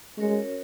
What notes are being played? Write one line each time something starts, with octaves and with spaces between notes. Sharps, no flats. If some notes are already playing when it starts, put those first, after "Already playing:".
G#3 C#4 F#4 A#4 C#5